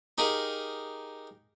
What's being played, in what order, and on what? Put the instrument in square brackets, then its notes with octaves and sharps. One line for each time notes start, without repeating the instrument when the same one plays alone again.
[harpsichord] D#4 G4 G#4 A#4 F5